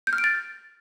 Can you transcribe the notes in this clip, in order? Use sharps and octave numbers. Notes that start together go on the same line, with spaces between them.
G6
F6
D7
A6